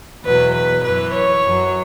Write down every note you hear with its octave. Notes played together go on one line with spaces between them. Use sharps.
E2 B2 F#3 B4
B4
F#2 E3 B4
C#5
F#2 F#3